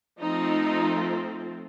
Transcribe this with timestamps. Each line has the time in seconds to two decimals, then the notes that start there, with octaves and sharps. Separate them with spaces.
0.19 F3 A3 C4 D#4